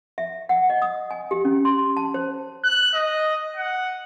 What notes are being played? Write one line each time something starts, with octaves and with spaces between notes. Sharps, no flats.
E5
F#5
D#5
D#6
G#5
G4
C#4
C6
A5
C5
F#6
D#5
F#5